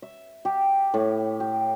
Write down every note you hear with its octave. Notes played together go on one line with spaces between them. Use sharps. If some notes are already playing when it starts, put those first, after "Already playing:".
E5
G4
A2
G4